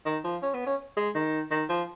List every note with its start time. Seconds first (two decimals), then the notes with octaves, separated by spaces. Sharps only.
0.06 D#3
0.24 F3
0.43 C#4
0.54 B3
0.67 C#4
0.97 G#3
1.15 D#3
1.51 D#3
1.69 F3